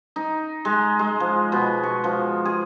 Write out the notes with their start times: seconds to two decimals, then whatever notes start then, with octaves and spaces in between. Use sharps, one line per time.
0.16 D#4
0.65 G#3
0.99 G#3
1.20 F3
1.52 B2
1.83 C#6
2.04 F3
2.45 G#4